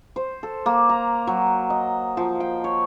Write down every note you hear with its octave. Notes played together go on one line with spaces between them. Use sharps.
C5
A4
A#3
A#5
F#3
D#5
F3
G5
C#5